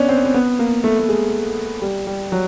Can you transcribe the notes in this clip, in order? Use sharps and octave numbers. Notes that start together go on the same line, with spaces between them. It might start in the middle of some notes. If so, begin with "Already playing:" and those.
Already playing: B3 C#4 D4
C4
C4
B3
A#3
A3
A3
G#3
G3
G3
F#3